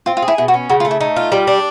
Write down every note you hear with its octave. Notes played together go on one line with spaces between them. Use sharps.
C4 F4
F4
G#4
E4
B2 E4
F#4
C#4
C#3 F#4
F4
A3
E4
A3 D#4
F4
G3
D4